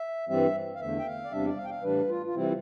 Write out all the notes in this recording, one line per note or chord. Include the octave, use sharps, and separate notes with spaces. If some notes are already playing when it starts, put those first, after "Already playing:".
Already playing: E5
G2 E3 G3 C4 E5
F5
E2 D3 A3 E5
G5
F5
D5
E2 C3 G3 D4 E5
D5
F5
G5
F5
A2 E3 G3 D4 B4
F4
F4
C3 E3 G3 C4 E4